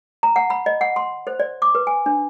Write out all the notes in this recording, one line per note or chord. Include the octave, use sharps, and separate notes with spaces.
A#5
F#5
B5
D#5
F#5
C6
C5
D5
D6
B4
G#5
D4